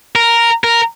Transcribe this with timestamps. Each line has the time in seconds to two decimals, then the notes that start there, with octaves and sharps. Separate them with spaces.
0.15 A#4
0.64 A#4